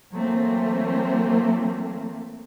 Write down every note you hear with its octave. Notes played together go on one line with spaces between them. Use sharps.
E3 F#3 A3 A#3 C4